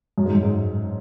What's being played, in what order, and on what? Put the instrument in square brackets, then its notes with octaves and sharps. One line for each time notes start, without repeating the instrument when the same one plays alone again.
[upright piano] F#2
G#2
F#2
G#2